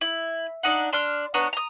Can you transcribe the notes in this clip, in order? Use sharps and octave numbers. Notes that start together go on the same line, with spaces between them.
E4
D4 D#4 F#5
D4 C6 F6
B3 D4 C#5 A#5
A#5 D#6